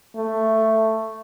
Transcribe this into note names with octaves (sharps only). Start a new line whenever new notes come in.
A3